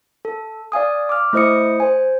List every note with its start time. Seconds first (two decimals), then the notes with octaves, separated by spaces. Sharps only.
0.25 A4
0.72 D5 F5 G#5 D#6
1.09 D6 F6
1.33 A3 E4 C5 D#5 D#6 C#7
1.80 C5 G#5